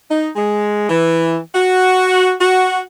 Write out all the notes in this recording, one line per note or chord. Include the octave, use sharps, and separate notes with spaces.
D#4
G#3
E3
F#4
F#4